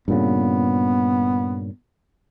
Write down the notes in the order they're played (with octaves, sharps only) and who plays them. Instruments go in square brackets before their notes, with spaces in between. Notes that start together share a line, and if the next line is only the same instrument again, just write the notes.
[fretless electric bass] G2 A#2 C#3 [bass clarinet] B3